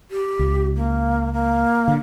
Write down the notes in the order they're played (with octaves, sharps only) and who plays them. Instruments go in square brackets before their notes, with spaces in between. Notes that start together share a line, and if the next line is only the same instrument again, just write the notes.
[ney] G4
[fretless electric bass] C#2
[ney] A#3
A#3
[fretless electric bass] D3